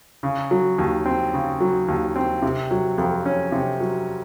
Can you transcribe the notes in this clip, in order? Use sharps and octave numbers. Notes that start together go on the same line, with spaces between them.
C#3
F#3
D#2
C4
C#3
F#3
D#2
C4
C3
F#3
F2
C#4
C3
F#3